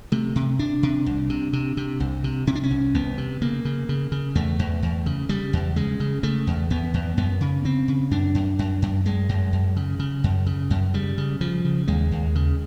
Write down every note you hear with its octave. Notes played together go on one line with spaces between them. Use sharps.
C3 A3
C3
C3 D4
C3
C2
C3
C3
C3
C2
C3
C3 C#4
D4
C#4
C2
C2 B3
C3
C#3 A#3
C#3
C#3
C#3
E2 A3
E2
E2
C#3
C#3 G3
E2
C#3 G#3
C#3
C#3 A3
E2
E2 B3
E2
F#2 B3
C#3
C#3 C4
C#3
F#2 D4
F#2
F#2
F#2
F#2 G#3
F#2
F#2
C#3
C#3
F#2
C#3
F#2
C#3 G3
C#3
C#3 F3
C#3
D#2 G#3
D#2
C#3